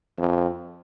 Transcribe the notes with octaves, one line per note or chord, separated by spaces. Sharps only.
F2